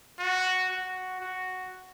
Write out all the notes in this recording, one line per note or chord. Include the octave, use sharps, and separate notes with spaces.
F#4
F#4
F#4